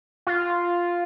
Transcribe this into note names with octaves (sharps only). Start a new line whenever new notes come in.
F4